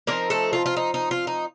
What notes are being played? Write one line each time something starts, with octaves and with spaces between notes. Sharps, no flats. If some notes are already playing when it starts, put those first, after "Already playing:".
F3 A#3 C4 D#4 A#4
A3 A4
F4
F4
D#4
D#4
F4
D#4